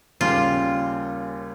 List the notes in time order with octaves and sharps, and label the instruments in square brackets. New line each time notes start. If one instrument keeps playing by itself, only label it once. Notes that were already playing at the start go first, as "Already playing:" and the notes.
[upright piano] D#2 C#3 G3 C#4 [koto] F4